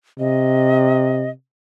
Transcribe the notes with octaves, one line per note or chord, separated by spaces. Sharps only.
C3 D#5